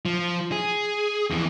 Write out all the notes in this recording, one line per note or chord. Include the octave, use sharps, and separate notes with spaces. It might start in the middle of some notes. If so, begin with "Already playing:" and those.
F3
G#4
F2 E3